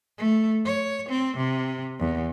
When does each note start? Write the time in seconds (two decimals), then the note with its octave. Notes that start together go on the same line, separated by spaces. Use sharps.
0.18 A3
0.66 C#5
1.09 C4
1.37 C3
2.00 E2